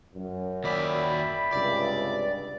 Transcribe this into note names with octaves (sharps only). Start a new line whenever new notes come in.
F#2
D#2 D5 E5 G5 B5
C#2 G2 C3 D5